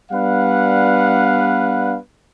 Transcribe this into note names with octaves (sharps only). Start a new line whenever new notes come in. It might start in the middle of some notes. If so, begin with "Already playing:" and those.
G3 B3 D4 B4 F5 F#5